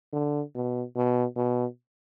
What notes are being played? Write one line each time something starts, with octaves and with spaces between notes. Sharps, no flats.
D3
B2
B2
B2